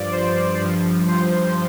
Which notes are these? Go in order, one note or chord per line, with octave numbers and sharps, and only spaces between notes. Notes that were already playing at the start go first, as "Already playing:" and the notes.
Already playing: G2 F3 D5
C5
G2 F3
C5